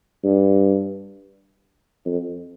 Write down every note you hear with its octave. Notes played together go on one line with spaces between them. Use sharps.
G2
F2